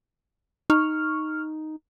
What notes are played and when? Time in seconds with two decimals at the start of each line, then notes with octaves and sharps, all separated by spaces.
0.70 D#4 C#6 F6